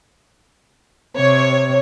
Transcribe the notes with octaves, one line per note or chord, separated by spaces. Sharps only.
C3 C#5